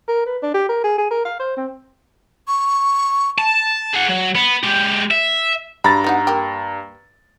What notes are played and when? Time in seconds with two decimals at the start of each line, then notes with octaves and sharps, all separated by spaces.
0.08 A#4
0.26 B4
0.43 D4
0.54 G4
0.69 A#4
0.84 G#4
0.98 G#4
1.11 A#4
1.25 F5
1.40 C5
1.57 C4
2.48 C#6
3.38 A5
3.94 G#4 F#5
4.09 F#3
4.35 B3
4.63 G#3 G4
5.11 E5
5.84 G2 F#3 A#5 B5 A6
6.04 B3 D#4 F#4
6.27 A#3 G4